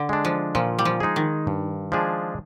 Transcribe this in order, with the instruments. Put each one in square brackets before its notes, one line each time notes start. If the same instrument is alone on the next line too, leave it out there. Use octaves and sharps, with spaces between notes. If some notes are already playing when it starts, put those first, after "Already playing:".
Already playing: [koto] D3
[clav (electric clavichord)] G#3 D4
[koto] F3
[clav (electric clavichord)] A#2 [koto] F3
[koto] G3
F3
[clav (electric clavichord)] G#3 D#4 G#4
[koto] D#3
[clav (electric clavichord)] G2
F3 G#3 D4 G#4